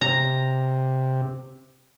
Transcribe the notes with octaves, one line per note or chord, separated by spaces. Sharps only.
C3 A#5